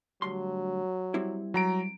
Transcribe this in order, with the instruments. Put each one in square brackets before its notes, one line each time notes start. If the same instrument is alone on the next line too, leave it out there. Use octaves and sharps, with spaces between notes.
[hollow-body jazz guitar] D2 G2 C6 [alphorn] F#3
[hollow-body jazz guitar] G3 C4 E4
[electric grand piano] F#3 A#5 D7